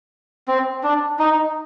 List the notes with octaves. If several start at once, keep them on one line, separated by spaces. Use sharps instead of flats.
C4
D4
D#4